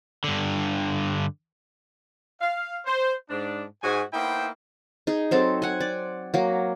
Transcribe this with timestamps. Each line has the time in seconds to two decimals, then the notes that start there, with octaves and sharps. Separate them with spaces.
0.24 G2 D3
2.41 F5
2.86 C5
3.30 G#2 D4
3.83 G#2 F#4 G#5
4.13 A#3 B3 D#4 E4 C5 G5
5.07 D#4 G#4
5.31 F#3 C4 A4
5.62 F#5 G#5
5.80 D5
6.34 F#3 A#3